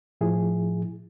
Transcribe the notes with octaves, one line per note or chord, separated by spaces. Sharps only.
A2 F3 E4 G#4